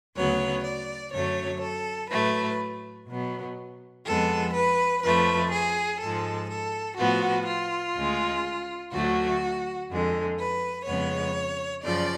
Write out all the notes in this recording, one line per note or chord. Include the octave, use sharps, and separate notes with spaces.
D2 C#3 F#3 B3 C#5
D5
F#2 D3 F#3 A3 C#5
A4
A2 F#3 A3 B4
B2 F#3 B3
F2 F3 G#3 B3 A4
B4
F2 F3 A3 B4
G#4
G#2 F3 G#3 A4
A4
A2 F3 B3 F#4
F4
D2 C#3 G#3
D2 D3 F#3 A3 F#4
F2 D3 G#3
B4
F2 C#3 G#3 B3 C#5
F#2 C#3 F3 D5